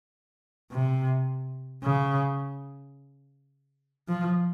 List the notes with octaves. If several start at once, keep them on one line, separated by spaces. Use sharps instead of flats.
C3
C#3
F3